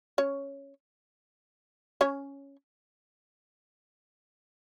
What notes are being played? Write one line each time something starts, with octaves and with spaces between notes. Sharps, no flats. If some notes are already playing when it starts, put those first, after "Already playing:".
C#4 C#5
C#4 C#5